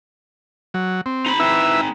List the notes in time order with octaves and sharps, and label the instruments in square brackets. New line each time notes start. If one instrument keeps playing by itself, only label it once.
[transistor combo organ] F#3
C4
[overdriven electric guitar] D#4 B5
[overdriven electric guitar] C4 D#4 [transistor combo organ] E4 B4 E5